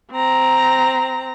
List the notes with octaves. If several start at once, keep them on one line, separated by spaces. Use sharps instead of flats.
C4 A#5